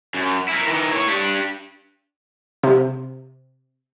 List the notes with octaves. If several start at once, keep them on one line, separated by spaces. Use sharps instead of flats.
F#2
E4 A#4
D#3 E3
A2 C#5
D4 G4
C3